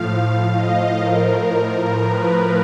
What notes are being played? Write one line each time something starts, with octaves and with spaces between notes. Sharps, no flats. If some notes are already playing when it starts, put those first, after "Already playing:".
Already playing: A2 F3 F5
D#5
A2 F3 A#4
A#4
B4